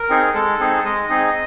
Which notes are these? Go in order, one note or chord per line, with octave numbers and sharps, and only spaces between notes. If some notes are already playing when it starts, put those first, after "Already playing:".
Already playing: A#4
C4 D#4 G#4
G#3 A4
C4 D#4 G#4
G#3 D#5
C4 D#4 G#4